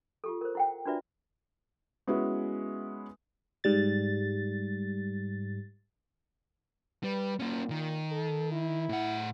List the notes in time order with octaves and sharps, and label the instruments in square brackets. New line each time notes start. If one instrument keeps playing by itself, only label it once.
[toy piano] F4 G4 A4
A#4 C5
E4 F#5 G5
D4 F4 F#4 B4 D5 E5
[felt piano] G#3 B3 C#4 E4 F#4 B4
[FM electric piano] G#2 G3 A6
[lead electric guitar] G3 [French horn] B4
[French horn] A#2 [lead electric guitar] A#3 C#4
[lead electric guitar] D#3
[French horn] A4
E4
[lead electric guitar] A2 F#5